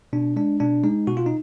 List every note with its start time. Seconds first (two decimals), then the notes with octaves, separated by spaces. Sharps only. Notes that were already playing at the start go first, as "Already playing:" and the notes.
0.13 B2 D4
0.36 G#3 D4
0.60 B2 D4
0.84 G#3 D#4
1.07 B2 F#4
1.17 F4
1.26 D#4